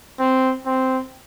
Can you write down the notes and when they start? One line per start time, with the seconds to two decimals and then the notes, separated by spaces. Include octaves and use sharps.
0.19 C4
0.66 C4